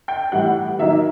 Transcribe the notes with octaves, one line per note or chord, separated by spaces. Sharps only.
G5
A2 E3 G3 F#5
D#3 F#3 A#3 D#4 E5